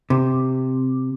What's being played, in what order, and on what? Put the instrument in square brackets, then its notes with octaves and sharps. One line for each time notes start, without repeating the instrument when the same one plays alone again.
[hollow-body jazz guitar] C3